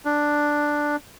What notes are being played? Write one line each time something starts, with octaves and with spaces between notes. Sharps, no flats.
D4